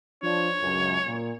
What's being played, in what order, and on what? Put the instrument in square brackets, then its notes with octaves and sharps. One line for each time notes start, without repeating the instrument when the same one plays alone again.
[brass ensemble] F3 D4 [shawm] C#5
[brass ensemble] C#2 F#2
A#2